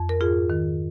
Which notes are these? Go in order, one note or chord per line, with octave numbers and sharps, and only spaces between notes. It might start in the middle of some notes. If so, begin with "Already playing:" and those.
Already playing: F2
A#4
G#2 F4 G#4
D#3